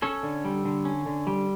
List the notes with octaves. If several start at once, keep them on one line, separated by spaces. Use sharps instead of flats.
C#4 A4 C#5
D3
G3
D3
C#4
D3
G3